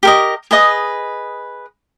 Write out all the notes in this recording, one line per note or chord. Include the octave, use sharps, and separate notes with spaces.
G4 A#4 D#5
G#4 B4 D#5 D#6